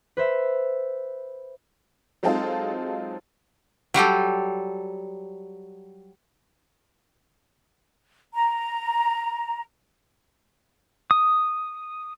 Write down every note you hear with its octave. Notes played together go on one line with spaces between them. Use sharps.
B4 C5 E5
F#3 G#3 C4 D#4 F4 A4
F#3 G3 G4 A4
A#5
D#6